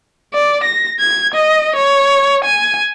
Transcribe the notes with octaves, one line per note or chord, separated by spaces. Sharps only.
D5
A#6
G#6
D#5
C#5
G#5